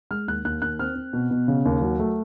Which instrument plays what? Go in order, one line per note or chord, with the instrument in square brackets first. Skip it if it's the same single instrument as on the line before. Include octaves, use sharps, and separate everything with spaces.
[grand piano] G#3 F6
D#2 F#6
D#2 F#6
D#2 F#6
C4 F6
C4
B2
B2
C#3
D#2
F#3
A3